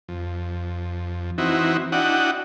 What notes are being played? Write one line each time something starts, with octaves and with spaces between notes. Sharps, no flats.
F2
E3 C4 D#4 E4 F#4
D4 E4 F#4 D#5 F#5 G5